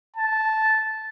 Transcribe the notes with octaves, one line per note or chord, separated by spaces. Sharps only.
A5